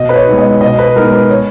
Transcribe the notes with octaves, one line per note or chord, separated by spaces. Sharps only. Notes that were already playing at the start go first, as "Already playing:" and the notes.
Already playing: B2 D#5
B4
C#5
G#3 B3 D#4
D#5
B2 D#5
B4
G#3 B3 D#4 A#4
B4
C#5